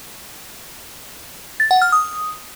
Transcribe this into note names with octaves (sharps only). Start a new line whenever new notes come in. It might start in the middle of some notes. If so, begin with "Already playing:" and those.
A6
F#5
F6
D#6